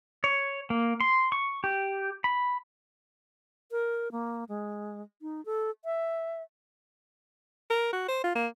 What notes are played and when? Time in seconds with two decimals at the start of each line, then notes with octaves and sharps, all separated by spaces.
0.24 C#5
0.70 A#3
1.01 C6
1.32 C#6
1.64 G4
2.24 B5
3.71 A#4
4.12 A#3
4.49 G#3
5.22 D#4
5.46 A4
5.85 E5
7.70 A#4
7.93 F#4
8.08 C5
8.24 F4
8.35 A#3